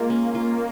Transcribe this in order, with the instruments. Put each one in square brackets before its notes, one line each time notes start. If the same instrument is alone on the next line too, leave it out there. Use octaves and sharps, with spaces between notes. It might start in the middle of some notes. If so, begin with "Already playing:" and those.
Already playing: [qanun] G#3 F4 [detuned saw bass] A#3
[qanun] C#4
F4